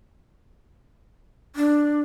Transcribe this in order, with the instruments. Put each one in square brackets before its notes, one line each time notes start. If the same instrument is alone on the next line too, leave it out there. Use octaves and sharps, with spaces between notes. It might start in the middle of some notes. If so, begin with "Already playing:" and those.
[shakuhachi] D4